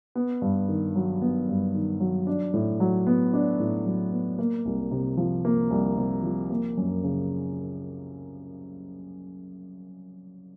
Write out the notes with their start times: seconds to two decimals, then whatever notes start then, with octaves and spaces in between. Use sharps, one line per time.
0.15 B3
0.42 G2
0.69 D#3
0.96 F#3
1.22 B3
1.48 G2
1.75 D#3
2.00 F#3
2.27 D4
2.54 A2
2.80 F#3
3.07 B3
3.33 D4
3.60 A2
3.86 F#3
4.12 B3
4.39 A#3
4.65 C2
4.91 C3
5.17 F3
5.45 A#3
5.71 C2
5.97 C3
6.23 F3
6.50 A#3
6.77 F#2
7.03 C#3